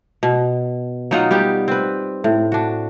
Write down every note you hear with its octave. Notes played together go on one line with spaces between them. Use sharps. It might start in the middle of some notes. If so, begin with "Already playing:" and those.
B2
F#3 D#4 F4 F#5
G3 B3 G4
C4 B4
A2
D4 F#4